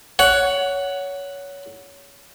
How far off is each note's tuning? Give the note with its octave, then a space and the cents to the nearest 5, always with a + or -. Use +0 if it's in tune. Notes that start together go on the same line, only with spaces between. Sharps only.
C#5 +20 F#5 +0